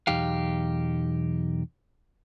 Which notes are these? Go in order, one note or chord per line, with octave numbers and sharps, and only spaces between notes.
B1 E2 D#4 G4 F5